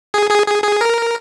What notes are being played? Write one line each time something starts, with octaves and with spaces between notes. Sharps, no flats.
G#4
G#4
G#4
G#4
A#4